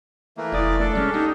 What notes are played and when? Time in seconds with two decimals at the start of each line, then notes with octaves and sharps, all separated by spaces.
0.37 E3 A3 A#3
0.52 F1 E4 D5 D#6
0.80 A3 D4 A4
0.95 C2 G3 G#3 C#4
1.14 A#3 D#4 G4